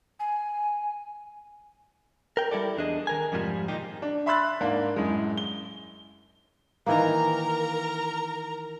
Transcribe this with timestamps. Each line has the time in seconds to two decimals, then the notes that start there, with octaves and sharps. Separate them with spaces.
0.20 G#5
2.37 A#4 G5
2.51 G3 E4 A4 D5
2.78 E2 D4 G#4 D#5
3.07 D#3 A#4 G#5
3.32 F2 G#2 C3 F3 G3
3.68 A#2 D#3 A#3 D#4 G4
4.02 D4
4.26 E5 B5 C6 E6 F#6 A6
4.60 G#2 A#3 D4
4.96 F#2 A2 G#3
5.38 G7
6.86 D#3 E3 A#3 A#4 A#5